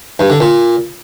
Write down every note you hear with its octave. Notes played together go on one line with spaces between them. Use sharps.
G2
D3
A#2